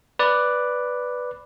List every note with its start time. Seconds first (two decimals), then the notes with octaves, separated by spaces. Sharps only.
0.19 B4 D5